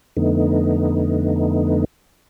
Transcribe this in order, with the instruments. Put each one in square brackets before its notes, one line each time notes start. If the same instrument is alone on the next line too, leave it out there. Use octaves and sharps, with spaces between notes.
[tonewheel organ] F2 D3 A3 B3 D#4